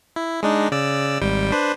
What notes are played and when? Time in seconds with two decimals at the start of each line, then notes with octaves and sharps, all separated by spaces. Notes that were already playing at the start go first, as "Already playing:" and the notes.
0.16 E4
0.43 G#3 D4 D#4
0.72 C#3 D5 E6
1.21 G#1 G3 G5
1.52 D4 B4 C5